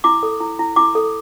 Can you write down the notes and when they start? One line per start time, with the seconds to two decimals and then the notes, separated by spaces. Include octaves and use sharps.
0.04 E4 D6
0.23 A4
0.40 E4
0.59 E4
0.76 E4 D6
0.95 A4